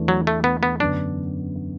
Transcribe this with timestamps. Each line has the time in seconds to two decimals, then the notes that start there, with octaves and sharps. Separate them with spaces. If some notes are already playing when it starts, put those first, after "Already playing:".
Already playing: E2 E3 A3 D4
0.08 F#3
0.27 A3
0.44 B3
0.63 B3
0.80 F#2 D3 B3 D4